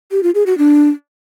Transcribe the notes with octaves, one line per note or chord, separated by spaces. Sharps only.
G4
F4
G#4
F#4
D4